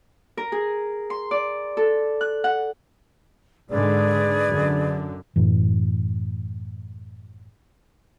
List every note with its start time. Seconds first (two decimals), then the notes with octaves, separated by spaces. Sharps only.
0.37 A#4
0.52 G#4
1.10 C6
1.31 D5
1.77 A4
2.21 F#6
2.44 F#5
3.70 G#2 D3 G#3 G#4 B4 D5
4.50 F#2 D3
5.36 F#2 A2 E3